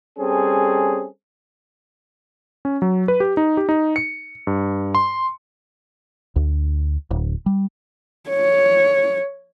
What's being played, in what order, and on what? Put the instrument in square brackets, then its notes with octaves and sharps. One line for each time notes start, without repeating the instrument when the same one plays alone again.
[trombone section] G3 C4 C#4 G#4 A4
[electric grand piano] C#4
F#3
B4
G4
D#4
G4
D#4
C#7
G2
C6
[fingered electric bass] D2
D1
G3
[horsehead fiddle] C#5